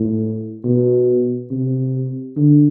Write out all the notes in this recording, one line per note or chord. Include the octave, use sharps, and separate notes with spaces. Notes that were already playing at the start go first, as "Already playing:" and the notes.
Already playing: A2
B2
C3
D3